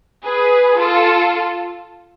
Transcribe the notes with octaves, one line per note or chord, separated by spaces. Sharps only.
G#4 B4
F4 A4